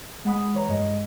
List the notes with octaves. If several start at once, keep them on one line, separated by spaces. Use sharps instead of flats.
G#3 F#5 B5 D#6
E3 C#5 A#5
G2 G#3 D#5